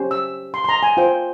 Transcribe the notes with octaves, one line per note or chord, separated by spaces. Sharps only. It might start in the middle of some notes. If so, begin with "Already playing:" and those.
Already playing: C#4 G4 C5
E6
C6
C6
A#5
G#5
F4 C5 G5